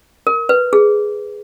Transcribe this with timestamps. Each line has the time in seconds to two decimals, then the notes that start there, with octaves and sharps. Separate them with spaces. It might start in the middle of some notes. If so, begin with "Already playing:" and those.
0.27 A#4
0.49 B4
0.73 G#4